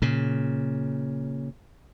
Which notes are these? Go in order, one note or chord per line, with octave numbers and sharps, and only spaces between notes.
A#2 C#3